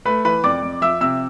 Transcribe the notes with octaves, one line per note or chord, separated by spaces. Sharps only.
A3 B4 B5
E3 B4 B5
F2 D5 D6
F2
F3 E5 E6
C3 E5 E6